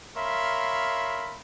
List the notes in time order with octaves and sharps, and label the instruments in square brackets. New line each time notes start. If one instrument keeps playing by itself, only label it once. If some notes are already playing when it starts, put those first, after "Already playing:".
[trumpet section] A#4 C#5 E5 F5 B5 C6